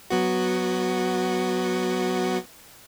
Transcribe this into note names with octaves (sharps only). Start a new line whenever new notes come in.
F#3 B3 F#4